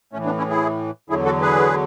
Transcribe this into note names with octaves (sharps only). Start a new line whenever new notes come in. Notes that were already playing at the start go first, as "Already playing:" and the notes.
A2 E3 A3 C#4
B3 D4
C#4 E4
E4 G#4
E2 D3 F#3 E4 G#4
F#4 A4
G#4 B4